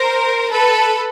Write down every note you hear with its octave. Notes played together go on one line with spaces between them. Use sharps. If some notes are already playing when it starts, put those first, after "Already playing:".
Already playing: A#4 C5
A4 B4